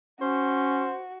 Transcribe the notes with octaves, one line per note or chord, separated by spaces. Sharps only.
C#4 F#4 C5